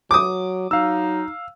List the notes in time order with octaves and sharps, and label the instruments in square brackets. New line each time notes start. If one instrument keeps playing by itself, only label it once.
[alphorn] F#3 [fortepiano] D6 D#6
[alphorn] F#3 [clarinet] D#4 [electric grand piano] F5 E6